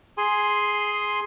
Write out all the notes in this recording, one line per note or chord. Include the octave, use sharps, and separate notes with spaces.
G#4 G#5 C6